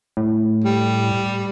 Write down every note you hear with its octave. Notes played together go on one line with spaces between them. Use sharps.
A2
G3